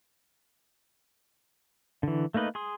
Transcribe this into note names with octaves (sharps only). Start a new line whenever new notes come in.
D3 E3
A3 A#3 D#4 B4 D#5
G#4 C6 D#6